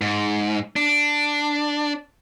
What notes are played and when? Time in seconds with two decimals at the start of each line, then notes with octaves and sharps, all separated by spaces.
0.01 G#2
0.76 D4